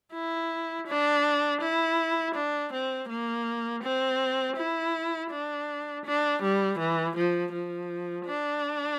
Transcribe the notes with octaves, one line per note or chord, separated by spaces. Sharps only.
E4
D4
E4
D4
C4
A#3
C4
E4
D4
D4
G3
E3
F3
F3
D4